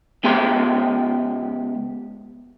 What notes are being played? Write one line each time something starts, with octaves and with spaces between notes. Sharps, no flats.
C#2 B3 G4 G5 C6